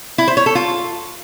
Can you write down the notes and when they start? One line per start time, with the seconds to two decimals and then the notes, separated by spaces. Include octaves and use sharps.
0.18 E4
0.28 C5
0.37 C#5
0.46 A4
0.55 F4